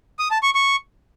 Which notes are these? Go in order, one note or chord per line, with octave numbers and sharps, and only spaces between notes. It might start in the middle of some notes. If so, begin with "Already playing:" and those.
D#6
A5
C#6
C#6